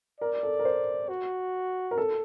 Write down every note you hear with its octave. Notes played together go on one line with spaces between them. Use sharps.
A#4 D5
A4
A#4
C5
F#4
A#4
A4